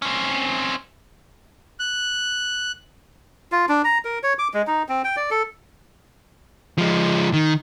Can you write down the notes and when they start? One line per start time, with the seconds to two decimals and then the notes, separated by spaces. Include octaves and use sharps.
0.02 C4 C#4
1.80 F#6
3.52 F4
3.69 D4
3.84 A#5
4.05 A#4
4.23 C#5
4.39 D6
4.54 G#3
4.67 D#4
4.89 C4
5.04 G5
5.17 D5
5.31 A4
6.78 F3 G#3
7.33 D#3